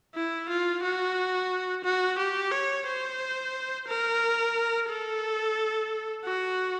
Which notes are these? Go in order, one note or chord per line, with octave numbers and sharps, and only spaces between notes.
E4
F4
F#4
F#4
G4
C#5
C5
A#4
A4
F#4